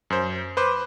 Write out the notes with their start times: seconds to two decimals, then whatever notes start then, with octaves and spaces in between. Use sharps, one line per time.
0.10 F#2 C5
0.57 B4 C5 D6